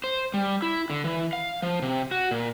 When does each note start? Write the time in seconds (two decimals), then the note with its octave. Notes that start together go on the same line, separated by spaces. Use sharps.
0.04 C5
0.34 G3
0.62 E4
0.90 D3
1.04 E3
1.33 F5
1.62 F3
1.82 C3
2.11 F#4
2.31 A#2